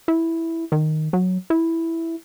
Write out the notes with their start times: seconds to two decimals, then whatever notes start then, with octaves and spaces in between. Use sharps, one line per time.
0.08 E4
0.72 D#3
1.13 F#3
1.50 E4